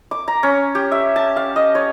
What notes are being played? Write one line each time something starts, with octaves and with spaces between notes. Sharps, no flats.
D6
A#5
C#4
G4
E5
A5
F5
D#5
C#5